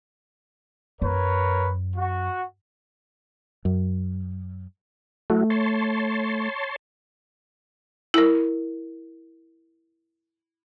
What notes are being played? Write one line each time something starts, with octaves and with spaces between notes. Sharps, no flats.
F#2 A#4 B4 C#5
F#4
F#2
F#3 A3 E4 F#4
C#5 A5 C6
E4 A#4